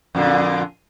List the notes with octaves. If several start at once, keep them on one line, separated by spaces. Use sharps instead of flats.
F2 A#2 D3